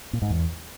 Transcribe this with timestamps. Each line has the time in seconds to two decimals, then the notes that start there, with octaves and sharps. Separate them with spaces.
0.13 A#2
0.22 G#2
0.30 E2